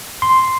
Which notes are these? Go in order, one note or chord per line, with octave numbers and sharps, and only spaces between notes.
C6